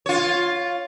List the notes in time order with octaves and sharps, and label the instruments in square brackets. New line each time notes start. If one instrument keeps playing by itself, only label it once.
[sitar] F4 C#5